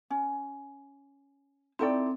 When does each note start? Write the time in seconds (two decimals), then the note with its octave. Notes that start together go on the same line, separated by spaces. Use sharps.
0.10 C#4
1.79 C4 D#4 E4 A4 D5 G5